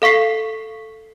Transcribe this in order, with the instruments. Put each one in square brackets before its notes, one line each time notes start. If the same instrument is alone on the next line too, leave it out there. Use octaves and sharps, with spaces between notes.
[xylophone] A4 F5 C#6 B6 C7